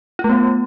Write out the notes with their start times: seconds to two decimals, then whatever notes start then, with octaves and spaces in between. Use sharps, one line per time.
0.19 F4
0.24 A3
0.29 B3